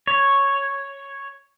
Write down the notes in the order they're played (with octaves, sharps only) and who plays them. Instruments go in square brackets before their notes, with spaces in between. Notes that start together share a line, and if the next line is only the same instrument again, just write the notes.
[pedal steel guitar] C#5